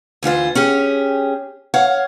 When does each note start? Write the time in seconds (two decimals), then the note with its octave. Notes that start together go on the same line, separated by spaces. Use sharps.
0.23 D2 E3 F4 C5
0.55 C#4 G4 G#4
1.74 C#5 F5 F#5